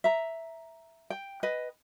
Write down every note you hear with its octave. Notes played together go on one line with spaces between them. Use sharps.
E5 A#5
G5
B4 D#5